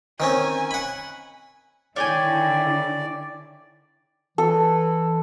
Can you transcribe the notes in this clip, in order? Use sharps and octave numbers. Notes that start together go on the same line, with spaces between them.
D#3 C4 C#4 G#5
F#5 B5
D3 D#3 E4 C#5 D5 G5 G#5
E3 A4